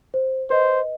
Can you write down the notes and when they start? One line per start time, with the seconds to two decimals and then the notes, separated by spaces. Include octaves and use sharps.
0.14 C5
0.50 B4 C5 D#5